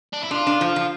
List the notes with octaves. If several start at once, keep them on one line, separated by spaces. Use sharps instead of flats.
D4
E4
D4 F4
D4
F3
F3